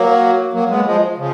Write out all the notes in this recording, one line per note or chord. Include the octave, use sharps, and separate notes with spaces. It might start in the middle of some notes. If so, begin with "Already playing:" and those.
Already playing: F#3 A#3
F#3 A#3
G#3 B3
F3 G#3
C#3 F3